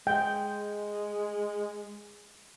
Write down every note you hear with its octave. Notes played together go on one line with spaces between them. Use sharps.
G#3 G5